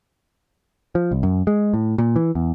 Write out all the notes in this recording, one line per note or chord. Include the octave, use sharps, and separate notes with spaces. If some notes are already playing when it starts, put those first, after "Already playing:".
F3
C2
F#2
G#3
A2
A#2
E3
E2